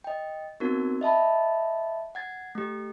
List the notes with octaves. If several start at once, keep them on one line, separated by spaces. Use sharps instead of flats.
D#5 G5
B3 C4 D#4 F#4 A#4
D#5 E5 A5 B5
F#5 G#6 A6
A3 G4